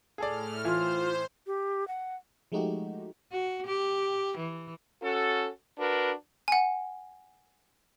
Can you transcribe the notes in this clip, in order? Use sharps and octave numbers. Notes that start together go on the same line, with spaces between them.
A2 G#4 A4 D5 F6
E3 F4 C5
G4
F#5
F3 G#3 A3 D#4 F#4 G4
F#4
G4
E3
C#4 F#4 A4
D4 F#4 A#4 B4
F#5 G#5